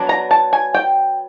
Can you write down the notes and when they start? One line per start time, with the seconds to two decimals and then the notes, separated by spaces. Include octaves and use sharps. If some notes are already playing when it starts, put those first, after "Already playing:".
Already playing: F#3 B3 D4
0.09 A#5
0.31 A5
0.53 G#5
0.74 G5